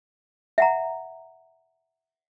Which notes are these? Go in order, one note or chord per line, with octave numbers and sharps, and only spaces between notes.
E5 F#5 A#5